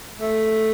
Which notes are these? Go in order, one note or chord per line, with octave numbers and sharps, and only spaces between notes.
A3